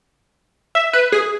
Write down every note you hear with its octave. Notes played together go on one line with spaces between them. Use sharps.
E5
B4
G#4